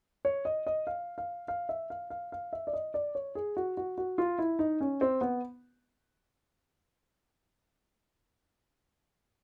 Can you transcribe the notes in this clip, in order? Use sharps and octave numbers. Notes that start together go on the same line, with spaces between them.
C#5
D#5
D#5
F5
F5
F5
E5
F5
F5
F5
E5
D5
D#5
D5
C#5
G#4
F#4
F#4
F#4
F4
E4
D#4
C#4
C4
B3